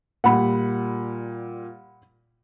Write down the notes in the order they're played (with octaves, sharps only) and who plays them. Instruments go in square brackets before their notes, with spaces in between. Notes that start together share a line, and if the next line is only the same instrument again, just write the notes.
[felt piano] A#2 G3 [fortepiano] F#5 B5